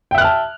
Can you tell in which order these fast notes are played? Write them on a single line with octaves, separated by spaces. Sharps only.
G5 E5 F#6 F6 A5